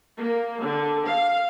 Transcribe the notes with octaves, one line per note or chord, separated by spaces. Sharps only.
A#3
D3
F5